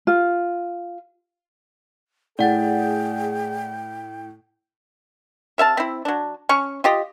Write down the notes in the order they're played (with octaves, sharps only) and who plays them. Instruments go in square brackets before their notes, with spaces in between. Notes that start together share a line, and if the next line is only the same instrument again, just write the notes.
[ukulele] F4
[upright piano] A2 [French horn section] G#4 [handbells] D5 F#5 A6 [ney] G5
[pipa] C3 E5 F5 A5
C4 E4
F#3 D4
C#4 C#5 C#6
F4 G4 D#5